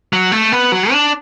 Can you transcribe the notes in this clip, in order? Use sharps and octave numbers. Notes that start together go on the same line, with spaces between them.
F#3
A3
B3
F#3
D4